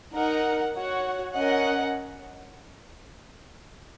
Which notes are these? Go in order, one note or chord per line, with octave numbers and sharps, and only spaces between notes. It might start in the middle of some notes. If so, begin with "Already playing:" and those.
D#4 A#4 F#5
F#4 C#5 F#5
C#4 A#4 D#5 F#5